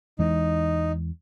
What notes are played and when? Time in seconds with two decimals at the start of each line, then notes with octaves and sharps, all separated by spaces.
0.19 E2 E3 G#3 D#4